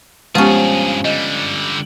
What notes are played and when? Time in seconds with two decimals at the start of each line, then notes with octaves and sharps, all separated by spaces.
0.35 G2 F3 G#3 B3 C#4 G4 G#4
1.05 D3 G3 D#5